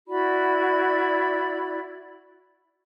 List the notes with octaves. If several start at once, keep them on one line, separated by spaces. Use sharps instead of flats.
E4 F#4 D5 B5